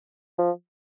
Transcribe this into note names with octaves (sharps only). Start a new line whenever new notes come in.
F3